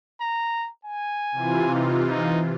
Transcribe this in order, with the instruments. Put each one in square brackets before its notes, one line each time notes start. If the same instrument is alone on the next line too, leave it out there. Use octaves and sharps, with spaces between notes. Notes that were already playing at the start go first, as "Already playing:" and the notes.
[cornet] A#5
G#5
[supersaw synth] C3 E3 F4
[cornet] D#4
D#4